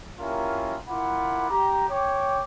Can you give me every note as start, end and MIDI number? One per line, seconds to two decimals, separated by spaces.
0.20 0.77 58
0.20 0.77 61
0.20 0.77 64
0.20 0.77 65
0.20 0.77 67
0.20 0.77 70
0.89 1.48 64
0.89 1.48 65
0.89 1.48 70
0.89 1.48 78
0.89 1.48 83
0.89 1.48 86
1.51 1.85 67
1.51 1.85 82
1.89 2.43 73
1.89 2.43 79
1.89 2.43 86